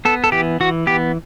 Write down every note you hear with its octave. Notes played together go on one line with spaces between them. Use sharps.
B3 A4
A4
E3 G4
E3 F#4
B3 G4